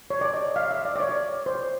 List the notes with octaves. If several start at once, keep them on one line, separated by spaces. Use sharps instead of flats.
C#5
D5
D#5
F5
E5
D5
D5
C#5
C5